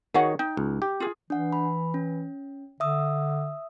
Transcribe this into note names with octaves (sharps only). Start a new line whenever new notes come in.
D#3 F#4 G#4 C#5 F#5
D#4 G5
C#2
G4
F4 G#4
E3 D4 F#5
B5
C#4
D3 E5 D#6 E6